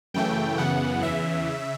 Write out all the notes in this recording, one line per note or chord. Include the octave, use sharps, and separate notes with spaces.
F#2 C#3 E3 A3 G5
F#2 C#3 E3 B3 F#5
E2 C#3 E3 E5
C#3